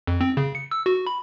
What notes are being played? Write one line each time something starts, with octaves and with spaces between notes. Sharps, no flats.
F2
C4
C#3
C#7
E6
F#4
B5